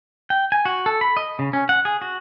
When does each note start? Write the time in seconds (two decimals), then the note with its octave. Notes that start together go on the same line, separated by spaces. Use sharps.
0.30 G5
0.52 G#5
0.65 F#4
0.86 A4
1.01 B5
1.17 D#5
1.39 C#3
1.53 C#4
1.69 F#5
1.85 G#4
2.02 F#4